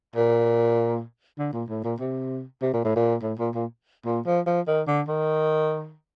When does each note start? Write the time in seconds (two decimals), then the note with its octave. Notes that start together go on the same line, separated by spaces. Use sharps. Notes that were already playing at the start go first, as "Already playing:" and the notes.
0.16 A#2
1.38 D3
1.53 A#2
1.69 A2
1.84 A#2
2.00 C3
2.62 C3
2.73 A#2
2.84 A2
2.96 A#2
3.23 A2
3.39 A#2
3.55 A#2
4.06 A#2
4.26 F3
4.46 F3
4.67 D#3
4.87 D3
5.07 D#3